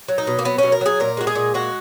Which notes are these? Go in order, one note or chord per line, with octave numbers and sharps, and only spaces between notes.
F#3
D#4
B2
A#3
F#3 B3
B2 C#4
A#4
F#3 G#4
A#2 A#4
G#3 F#4
G#4
A#2
G#3 F#4